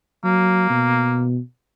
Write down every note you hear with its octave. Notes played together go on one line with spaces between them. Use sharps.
F#3 A#3
B2